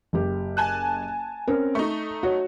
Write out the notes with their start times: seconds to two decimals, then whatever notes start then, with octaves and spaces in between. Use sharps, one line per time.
0.13 F#1 G4
0.57 G#5 A5 F#6
1.48 C4 C#4 A#4
1.75 A3 D#4 C#6
2.23 F#4 C#5